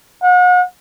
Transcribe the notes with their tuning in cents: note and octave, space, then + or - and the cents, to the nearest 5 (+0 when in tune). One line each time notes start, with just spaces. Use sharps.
F#5 -40